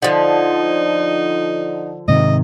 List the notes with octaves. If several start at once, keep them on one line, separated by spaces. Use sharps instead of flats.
D3 F3 D#4
G#2 C3 D#3 D#5